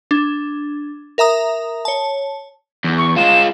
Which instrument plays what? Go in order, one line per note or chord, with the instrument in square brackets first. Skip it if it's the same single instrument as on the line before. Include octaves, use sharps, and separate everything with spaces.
[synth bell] D4
A#4 E5 A#5 D#6
C#5 A5
[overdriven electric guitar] E2
[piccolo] C#6
[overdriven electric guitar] G#3 F4 [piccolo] E7